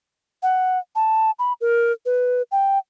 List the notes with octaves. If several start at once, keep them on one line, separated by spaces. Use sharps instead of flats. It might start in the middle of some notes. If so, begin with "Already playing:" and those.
F#5
A5
B5
A#4
B4
G5